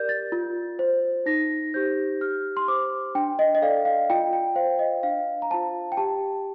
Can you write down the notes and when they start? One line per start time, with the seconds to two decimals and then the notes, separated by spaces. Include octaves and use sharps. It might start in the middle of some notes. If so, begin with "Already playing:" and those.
Already playing: G4 A#4 D5 G6
0.09 A6
0.32 F4
0.79 C5
1.26 D#4 A#6
1.74 G4 C5 G6
2.21 G4 F6
2.57 C6
2.68 C5 D6
3.15 D4 G5
3.39 D#5
3.55 D#5
3.62 A4 D5 F5
3.85 F5
4.10 F4 G5
4.33 G5
4.56 C5 F5
4.79 D#5
5.03 D4 F5
5.42 A#5
5.51 F4 C5 A5
5.92 G5
5.97 G4 A5